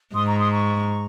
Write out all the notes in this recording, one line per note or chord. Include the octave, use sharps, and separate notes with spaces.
G#2 C6 D#6
A#5 C#6
C6 D#6
A#5 C#6